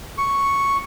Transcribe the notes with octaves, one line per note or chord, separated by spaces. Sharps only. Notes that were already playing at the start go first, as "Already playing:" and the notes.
C#6